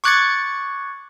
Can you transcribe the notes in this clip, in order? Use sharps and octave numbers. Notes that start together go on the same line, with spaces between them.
C#6 D6 F#6 G#6 A6 C#7